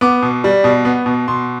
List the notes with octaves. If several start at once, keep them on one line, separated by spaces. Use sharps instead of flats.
B3 D6
B2
G3
B2
B3
B2
B2 C6